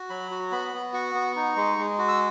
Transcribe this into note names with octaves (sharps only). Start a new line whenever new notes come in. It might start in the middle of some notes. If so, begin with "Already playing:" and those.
Already playing: F#4
F#3 B5
F#4
B3 B5
B3
F#4 C#6
B3
D#4
G#3
G#3
F#4
E6